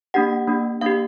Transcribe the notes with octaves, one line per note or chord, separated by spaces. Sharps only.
A#3 D4 G4 F#5
A#3 D4 G4
A#3 D4 G4 F5